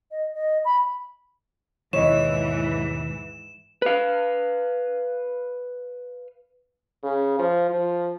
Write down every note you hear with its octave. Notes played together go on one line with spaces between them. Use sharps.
D#5
D#5
B5
D#2 G#2 B2 D#3 E3 C#5 D#5 E7
B4 F5
C#3
F3
F3